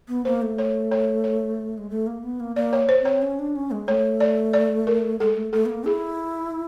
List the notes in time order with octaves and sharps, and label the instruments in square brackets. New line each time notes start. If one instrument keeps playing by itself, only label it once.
[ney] B3
[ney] A#3 [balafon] C5
[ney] A3
[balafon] C#5
C#5
C#5
[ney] G#3
A3
A#3
B3
A#3
[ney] A#3 [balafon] D5
[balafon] C#5
C5
[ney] C4 [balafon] C#5
[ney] C#4
D4
C#4
G#3
[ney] A3 [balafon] C#5
[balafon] D5
D5
A#4
[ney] G#3 [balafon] A4
[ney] A3
[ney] A3 [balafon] A4
[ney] B3
A#3
[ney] E4 [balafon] G#4